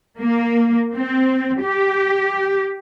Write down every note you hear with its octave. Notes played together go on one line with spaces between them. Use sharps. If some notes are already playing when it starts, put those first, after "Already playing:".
A#3
C4
G4